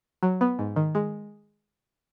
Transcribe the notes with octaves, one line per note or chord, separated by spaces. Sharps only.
F#3
B3
G#2
D#3
G#3